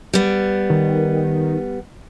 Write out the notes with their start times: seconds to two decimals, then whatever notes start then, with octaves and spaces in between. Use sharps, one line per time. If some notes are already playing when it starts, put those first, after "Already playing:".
0.13 G3 B3
0.70 D#3